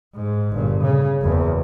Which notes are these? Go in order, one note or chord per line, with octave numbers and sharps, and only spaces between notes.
G#2
G1 A#2
C#3
F#1 E2